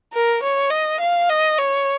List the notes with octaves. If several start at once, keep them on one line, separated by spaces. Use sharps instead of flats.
A#4
C#5
D#5
F5
D#5
C#5